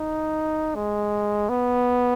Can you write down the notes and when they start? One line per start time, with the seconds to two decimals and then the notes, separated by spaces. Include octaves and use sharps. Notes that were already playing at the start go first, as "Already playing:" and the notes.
Already playing: D#4
0.75 G#3
1.49 B3